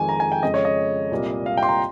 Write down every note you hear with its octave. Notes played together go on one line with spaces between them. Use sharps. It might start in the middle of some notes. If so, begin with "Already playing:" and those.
Already playing: F2 D#3 G#3 G#5
A#5
G#5
G5
F2 C#3 G#3 D#5
C#5
D#5
C2 A#2 G3 A#3
F5
G5
C6
A#5